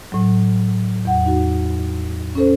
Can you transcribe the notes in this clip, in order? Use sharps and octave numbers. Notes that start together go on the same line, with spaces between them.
A2 F#3
E2 F#5
D#4 F#4
C#4 A4 C5